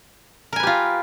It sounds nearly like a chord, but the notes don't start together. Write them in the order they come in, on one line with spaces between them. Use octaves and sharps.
A#4 G#5 B4 G4 F4